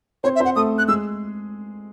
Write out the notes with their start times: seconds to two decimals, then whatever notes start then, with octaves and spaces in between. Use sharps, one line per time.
0.24 C4 C5 C#5
0.36 E5
0.40 C4 C5 F#5
0.56 A3 A4 D#6
0.78 F#6
0.88 G#3 G#4 E6